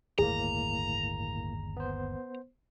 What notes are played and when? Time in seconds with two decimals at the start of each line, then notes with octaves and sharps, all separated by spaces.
0.18 G1 D#2 A2 A#3 G#4 A#5
1.77 B3 C5